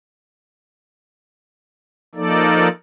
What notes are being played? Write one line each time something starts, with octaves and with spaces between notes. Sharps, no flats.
F3 A#3 D#4 A4 D5